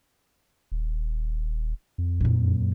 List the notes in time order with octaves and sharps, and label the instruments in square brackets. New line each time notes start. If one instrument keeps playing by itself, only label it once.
[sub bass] D#1
F2
[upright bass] F#2 A#2